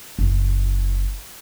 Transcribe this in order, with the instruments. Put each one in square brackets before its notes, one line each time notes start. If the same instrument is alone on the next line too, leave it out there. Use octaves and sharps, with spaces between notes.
[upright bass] F#1 E4